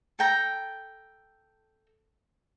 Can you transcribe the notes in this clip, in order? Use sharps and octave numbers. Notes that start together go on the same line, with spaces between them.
A4 G5 A#5